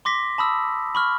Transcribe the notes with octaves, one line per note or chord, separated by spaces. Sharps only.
C6 D6 A#6 B6
A5 B5 D#6 E6
B5 C#6 F6